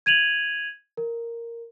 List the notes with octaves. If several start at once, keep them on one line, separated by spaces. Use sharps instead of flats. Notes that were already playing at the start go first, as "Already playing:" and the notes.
G#6 D#7 F7 F#7
A#4